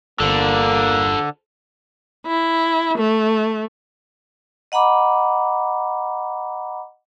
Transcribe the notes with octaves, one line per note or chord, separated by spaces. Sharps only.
G1 D3 A#3 A4 C5
E4
A3
D#5 F#5 A#5 B5 D6